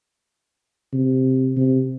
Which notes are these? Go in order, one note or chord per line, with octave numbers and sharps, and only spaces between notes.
C3
C3